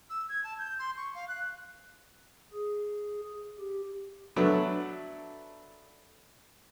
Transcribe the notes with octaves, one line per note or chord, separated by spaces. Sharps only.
E6
G#6
A5
G6
C6
C#6
F5
F#6
G#4
G4
F#3 A3 B3 D4